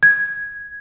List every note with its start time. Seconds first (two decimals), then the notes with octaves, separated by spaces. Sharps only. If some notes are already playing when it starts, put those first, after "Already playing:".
0.03 G#6